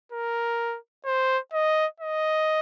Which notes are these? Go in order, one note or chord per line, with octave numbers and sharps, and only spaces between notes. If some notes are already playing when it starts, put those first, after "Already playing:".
A#4
C5
D#5
D#5